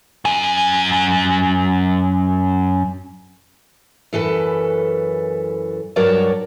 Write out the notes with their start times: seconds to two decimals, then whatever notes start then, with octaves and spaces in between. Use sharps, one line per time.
0.25 F#2 G#5
4.13 F#2 E3 A4 B4
5.96 G2 F#3 A#4 C#5 D5 A5